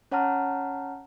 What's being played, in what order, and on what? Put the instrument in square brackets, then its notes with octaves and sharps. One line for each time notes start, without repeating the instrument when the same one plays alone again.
[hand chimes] C#4 C#5 F#5 A5 A#5 F6